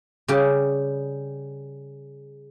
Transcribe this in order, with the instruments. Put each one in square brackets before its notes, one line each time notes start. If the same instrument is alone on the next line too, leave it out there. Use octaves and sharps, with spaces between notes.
[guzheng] C#3 G3 G4